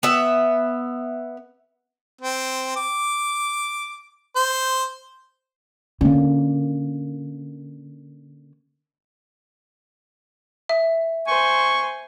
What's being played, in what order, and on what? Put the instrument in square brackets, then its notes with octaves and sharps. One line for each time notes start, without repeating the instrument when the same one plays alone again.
[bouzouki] B3 E5
[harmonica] C4
D6
C5
[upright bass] D3 [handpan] A#3 C#4
[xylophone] E5
[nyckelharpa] C5 G#5 [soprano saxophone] C#6